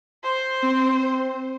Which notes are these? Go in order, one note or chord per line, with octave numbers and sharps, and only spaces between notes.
C5
C4